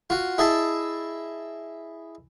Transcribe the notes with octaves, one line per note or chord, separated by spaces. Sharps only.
F4 F#4
E4 G#4 D#5 E5 A5